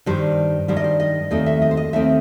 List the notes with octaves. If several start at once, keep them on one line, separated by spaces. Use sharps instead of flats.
G2 D#3 G3 C5
G2 D#3 G3 C5
D#5
C5
D#5
D#2 D#3 A3 C4 D#5
E5
D#5
C5
D#5
D#2 D#3 A3 C4 E5